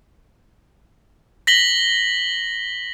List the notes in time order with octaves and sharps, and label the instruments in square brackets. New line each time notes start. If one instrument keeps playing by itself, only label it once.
[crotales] A#6 B6 F#7 G7